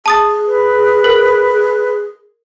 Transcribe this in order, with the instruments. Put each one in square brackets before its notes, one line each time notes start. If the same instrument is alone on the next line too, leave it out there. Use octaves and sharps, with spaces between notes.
[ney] G#4 [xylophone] A5 D#6 A6
[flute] B4
[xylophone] A#4